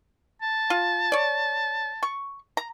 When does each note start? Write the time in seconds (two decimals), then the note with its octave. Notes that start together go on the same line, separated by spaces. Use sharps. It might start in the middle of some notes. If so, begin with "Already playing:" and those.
0.42 A5
0.70 F4
1.12 C#5 D5
2.03 C#6
2.57 A#5